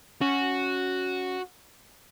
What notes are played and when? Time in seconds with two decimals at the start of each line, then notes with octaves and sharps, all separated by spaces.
0.21 C#4 F#4